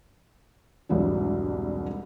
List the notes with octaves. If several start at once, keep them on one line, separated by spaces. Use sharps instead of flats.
E1 C2 G#2 E3 F#3 D4